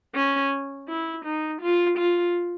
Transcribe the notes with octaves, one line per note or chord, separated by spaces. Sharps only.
C#4
E4
D#4
F4
F4